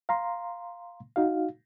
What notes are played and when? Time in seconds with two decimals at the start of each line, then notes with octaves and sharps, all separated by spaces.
0.09 F5 A#5 C6
1.16 D#4 F#4 F5